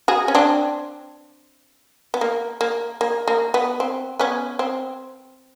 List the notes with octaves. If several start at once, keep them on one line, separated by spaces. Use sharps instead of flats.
F#4 G#4
C#4
C4 D4
B3
A#3
A#3
A#3
A#3
B3
C4
B3 C#4
C4